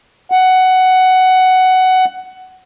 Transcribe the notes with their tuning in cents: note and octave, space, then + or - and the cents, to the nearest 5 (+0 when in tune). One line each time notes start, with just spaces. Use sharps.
F#5 +10